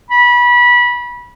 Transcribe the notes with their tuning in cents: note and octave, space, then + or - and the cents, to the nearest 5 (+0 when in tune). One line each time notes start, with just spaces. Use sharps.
B5 -25